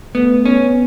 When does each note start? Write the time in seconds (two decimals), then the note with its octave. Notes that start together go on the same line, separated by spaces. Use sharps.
0.15 A3 B3
0.45 B3 C#4